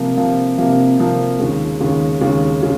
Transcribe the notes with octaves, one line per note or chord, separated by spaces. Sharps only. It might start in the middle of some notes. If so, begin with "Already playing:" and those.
Already playing: C3 F3 A#3
C3 F3 A#3
C3 F3 A#3
C3 F3 A#3
D#2 C#3 G#3
D#2 C#3 G#3
D#2 C#3 G#3
C#3 G#3